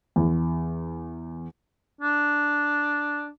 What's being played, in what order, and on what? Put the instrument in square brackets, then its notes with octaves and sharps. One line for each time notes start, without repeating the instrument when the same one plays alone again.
[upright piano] E2
[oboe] D4